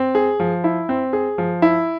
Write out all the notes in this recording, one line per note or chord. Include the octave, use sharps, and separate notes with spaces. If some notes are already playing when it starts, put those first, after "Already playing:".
Already playing: C4
G#4
F3
E4
C4
G#4
F3
E4